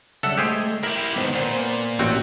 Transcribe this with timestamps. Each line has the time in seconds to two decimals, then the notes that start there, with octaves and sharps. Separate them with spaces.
0.23 C#3 G3 A4 E5 F#5
0.38 G#3 A3 G4 G#4 C5
0.83 E4 G4 A#4 C7
1.16 G#2 D#3 B3 C5
1.33 A#2
1.99 A1 C4 F#4 G4